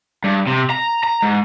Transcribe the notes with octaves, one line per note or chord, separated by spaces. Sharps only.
G2
C3
A#5
A#5
G#2